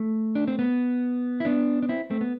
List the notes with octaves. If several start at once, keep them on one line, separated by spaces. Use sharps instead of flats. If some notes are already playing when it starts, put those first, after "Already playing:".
Already playing: A3
D4
C4
B3
E4
B3 D4
D4
C4 E4
A3 C4
B3